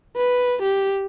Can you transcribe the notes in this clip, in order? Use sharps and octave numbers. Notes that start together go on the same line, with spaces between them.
B4
G4